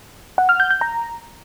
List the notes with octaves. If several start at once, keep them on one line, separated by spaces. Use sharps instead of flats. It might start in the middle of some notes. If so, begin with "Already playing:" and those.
F#5
F6
G6
G6
A#5